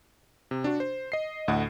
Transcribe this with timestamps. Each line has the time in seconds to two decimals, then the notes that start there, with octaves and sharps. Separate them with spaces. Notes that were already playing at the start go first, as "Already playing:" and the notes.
0.51 C3
0.64 D4 F#4
0.80 C5
1.12 D#5 C7
1.48 D2 A2 D#5 F#5